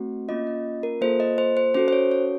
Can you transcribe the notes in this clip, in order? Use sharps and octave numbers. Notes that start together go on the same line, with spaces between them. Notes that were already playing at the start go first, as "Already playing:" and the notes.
Already playing: A3 C4 F#4
A#3 C#4 F4 D#5
D#5
A#4
A#3 F4 A4 C5
D#5
C5
C5
C#4 F#4 A4 C5
C5
C#5
C#5